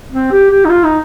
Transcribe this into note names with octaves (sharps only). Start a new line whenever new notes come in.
C4
G4
G4
D#4
F4
D#4